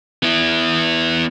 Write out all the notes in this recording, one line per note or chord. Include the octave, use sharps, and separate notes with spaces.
B3 E4